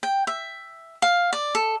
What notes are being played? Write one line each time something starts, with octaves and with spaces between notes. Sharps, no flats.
G5
E5
F5
D5
A4